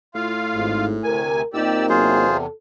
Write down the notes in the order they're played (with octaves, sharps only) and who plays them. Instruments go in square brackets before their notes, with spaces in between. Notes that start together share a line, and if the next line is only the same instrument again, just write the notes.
[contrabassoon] A2 [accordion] F4 F5
[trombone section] G#1 G#2
[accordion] D2 C3 G#5 [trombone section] A#4
[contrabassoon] A#2 [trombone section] A#3 C4 D#4 [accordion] G4 D5 E6
[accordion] E2 C3 [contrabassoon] F#3 [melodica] F4 G#4 C5
[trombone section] A4